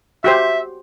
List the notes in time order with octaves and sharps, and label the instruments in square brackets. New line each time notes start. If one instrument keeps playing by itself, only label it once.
[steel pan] F#4 G4 C5 [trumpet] E5